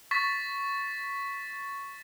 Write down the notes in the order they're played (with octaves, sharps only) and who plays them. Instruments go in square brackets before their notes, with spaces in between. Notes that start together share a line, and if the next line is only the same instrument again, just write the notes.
[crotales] C#6 A6 B6